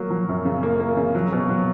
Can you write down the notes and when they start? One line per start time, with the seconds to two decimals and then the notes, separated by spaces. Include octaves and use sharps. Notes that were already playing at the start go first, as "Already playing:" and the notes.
Already playing: F#3 A#3
0.10 F#3
0.29 F#2
0.45 C#3
0.63 A#3
0.80 A#3
0.97 C#3
1.15 F#3
1.32 B2
1.49 F#3